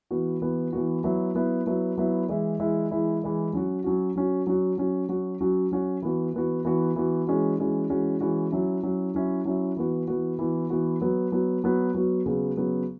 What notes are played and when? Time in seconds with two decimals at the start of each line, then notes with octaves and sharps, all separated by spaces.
0.11 E3 B3 F#4
0.42 E3 B3 F#4
0.73 E3 B3 F#4
1.04 F#3 B3 E4
1.35 F#3 B3 E4
1.67 F#3 B3 E4
1.97 F#3 B3 E4
2.29 E3 G#3 E4
2.60 E3 G#3 E4
2.91 E3 G#3 E4
3.22 E3 G#3 E4
3.53 F#3 C#4 F#4
3.84 F#3 C#4 F#4
4.16 F#3 C#4 F#4
4.47 F#3 C#4 F#4
4.78 F#3 C#4 F#4
5.09 F#3 C#4 F#4
5.41 F#3 C#4 F#4
5.71 F#3 C#4 F#4
6.02 E3 B3 F#4
6.34 E3 B3 F#4
6.65 E3 B3 F#4
6.96 E3 B3 F#4
7.27 E3 G#3 C#4 F#4
7.58 E3 G#3 C#4 F#4
7.89 E3 G#3 C#4 F#4
8.21 E3 G#3 C#4 F#4
8.52 F#3 C#4 E4
8.83 F#3 C#4 E4
9.15 F#3 C#4 E4
9.45 F#3 C#4 E4
9.77 E3 B3 F#4
10.08 E3 B3 F#4
10.39 E3 B3 F#4
10.70 E3 B3 F#4
11.01 F#3 B3 F#4
11.32 F#3 B3 F#4
11.64 F#3 B3 F#4
11.94 F#3 B3 F#4
12.26 C#3 F#3 B3
12.57 C#3 F#3 B3